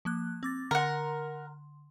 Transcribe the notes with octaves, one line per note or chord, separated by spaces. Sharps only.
F3 A#3 F#6
C4 D6 A6
D3 A#4 F#5 C6